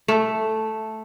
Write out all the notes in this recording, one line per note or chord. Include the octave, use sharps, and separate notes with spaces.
A3